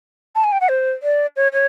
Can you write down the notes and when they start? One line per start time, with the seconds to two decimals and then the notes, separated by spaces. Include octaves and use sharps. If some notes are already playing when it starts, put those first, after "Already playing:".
0.35 A5
0.44 G#5
0.52 G5
0.61 F#5
0.69 C5
1.03 D5
1.36 C#5
1.53 C#5